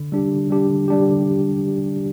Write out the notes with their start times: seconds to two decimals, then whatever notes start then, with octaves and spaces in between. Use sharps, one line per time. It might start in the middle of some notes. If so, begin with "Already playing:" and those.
Already playing: D3
0.12 G3 D4 G4
0.31 D3
0.50 G3 D4 G4
0.69 D3
0.88 G3 D4 G4
1.07 D3